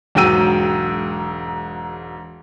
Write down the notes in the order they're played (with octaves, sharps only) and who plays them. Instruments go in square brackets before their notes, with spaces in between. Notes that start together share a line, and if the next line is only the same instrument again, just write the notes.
[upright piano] E1 G#2 F#3 G5 E6 D#7